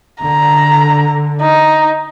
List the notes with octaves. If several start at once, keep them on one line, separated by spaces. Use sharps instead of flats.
D3 A#5
D#4